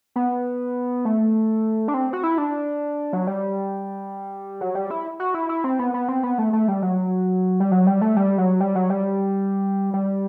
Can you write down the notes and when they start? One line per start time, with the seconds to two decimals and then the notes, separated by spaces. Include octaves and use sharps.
0.16 B3
1.05 A3
1.88 D4
1.94 C4
2.13 F#4
2.23 E4
2.38 D4
3.13 F#3
3.27 G3
4.61 F#3
4.75 G3
4.90 E4
5.20 F#4
5.34 E4
5.49 E4
5.64 C4
5.79 B3
5.94 B3
6.08 C4
6.23 B3
6.38 A3
6.53 A3
6.68 G3
6.82 F#3
7.60 G3
7.71 F#3
7.87 G3
8.01 A3
8.16 G3
8.38 F#3
8.60 G3
8.75 F#3
8.90 G3
9.94 G3